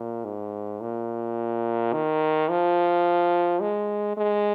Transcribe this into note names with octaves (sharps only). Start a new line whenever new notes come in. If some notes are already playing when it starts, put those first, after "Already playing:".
Already playing: A#2
G#2
A#2
D#3
F3
G#3
G#3